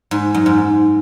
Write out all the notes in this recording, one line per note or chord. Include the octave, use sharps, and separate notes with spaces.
G#2
F#2
G#2